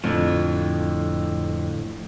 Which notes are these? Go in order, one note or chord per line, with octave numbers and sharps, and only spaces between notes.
F2 A2 D3